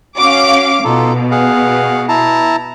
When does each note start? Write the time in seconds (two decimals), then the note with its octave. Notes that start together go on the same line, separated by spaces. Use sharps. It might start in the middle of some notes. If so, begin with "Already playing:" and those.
0.17 C#4 F#4 F5 D6
0.84 B2 D#4 F4 A4
1.31 G#4 F5 F#5
2.09 E4 A5 A#5